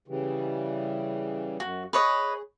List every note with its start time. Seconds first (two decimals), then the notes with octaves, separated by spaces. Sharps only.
0.08 C#3 E3 G3
1.60 F#2 F#4
1.93 G#4 B4 C#5 D#5